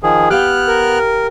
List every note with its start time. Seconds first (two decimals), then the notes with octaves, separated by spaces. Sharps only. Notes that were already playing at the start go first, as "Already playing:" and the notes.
0.03 D#3 F3 G#4
0.30 B3 G4 F5 G5 F6 F#6
0.68 A#4